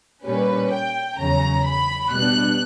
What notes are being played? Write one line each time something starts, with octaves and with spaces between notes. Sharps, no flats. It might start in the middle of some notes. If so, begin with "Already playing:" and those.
A#2 G3 C#4 B4
G5
E2 C#3 F#3 C#4 A#5
B5
B2 G3 B3 D4 F#6